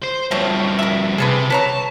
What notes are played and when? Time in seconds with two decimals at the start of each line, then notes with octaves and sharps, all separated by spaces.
0.02 C5
0.31 G2 F3 A3 C4 C#5
0.79 A#4 E5
1.18 C3 G#4 A4 B4
1.50 B4 C#5 A5 A#5